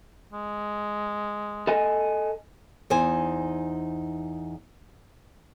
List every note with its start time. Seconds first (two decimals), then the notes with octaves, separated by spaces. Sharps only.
0.32 G#3
1.67 A4 D#5 G#5
2.90 E2 D#4 C5 G#5